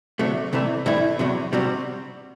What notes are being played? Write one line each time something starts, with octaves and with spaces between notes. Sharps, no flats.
D2 C3 F#3 A3
C2 C3 E3 A3
G2 E3 A3 E4
E2 C3 F#3
C3 G3 C4 F#4